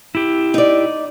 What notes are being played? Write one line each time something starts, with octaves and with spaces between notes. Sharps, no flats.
E4 G4
D#4 D5